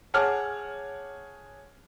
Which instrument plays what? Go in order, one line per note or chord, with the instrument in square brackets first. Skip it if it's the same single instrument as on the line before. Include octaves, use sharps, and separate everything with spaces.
[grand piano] G#4 C#5 F#5 A5 D6 F6